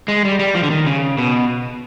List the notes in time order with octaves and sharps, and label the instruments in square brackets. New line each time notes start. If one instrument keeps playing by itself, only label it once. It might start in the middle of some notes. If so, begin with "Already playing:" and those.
[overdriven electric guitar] G#3
G3
G3
F3
D3
D#3
C#3
B2